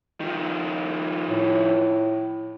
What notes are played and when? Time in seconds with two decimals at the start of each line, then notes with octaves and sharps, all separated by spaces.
0.20 D#3 F3
1.30 A2